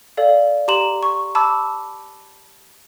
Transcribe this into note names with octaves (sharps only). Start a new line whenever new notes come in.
A4 D5 F5
G4 A#5 C6 E7 F#7
C#6
A5 B5 D6 E6